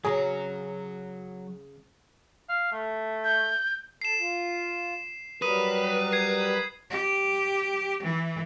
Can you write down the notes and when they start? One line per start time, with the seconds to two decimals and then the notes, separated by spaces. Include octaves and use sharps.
0.05 C#3 F#3 C#4 F#4 G#4 A#5
2.49 F5
2.72 A3
3.24 G6
4.02 A4 C7 E7
4.20 F4
5.42 F#3 G3 A#4 B4 D#6 D#7
6.13 G#6 C7
6.90 G4
8.02 E3